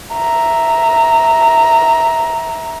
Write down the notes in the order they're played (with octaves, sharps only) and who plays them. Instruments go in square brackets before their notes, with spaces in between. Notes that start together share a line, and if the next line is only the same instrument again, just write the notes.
[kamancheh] E5 A#5